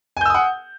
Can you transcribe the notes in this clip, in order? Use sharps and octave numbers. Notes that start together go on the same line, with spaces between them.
F#5 G#5 D#6 E6 G6